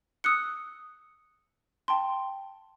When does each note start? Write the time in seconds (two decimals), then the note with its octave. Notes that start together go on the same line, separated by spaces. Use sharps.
0.24 D#6 E6 F#6 C#7
1.88 G5 A5 C6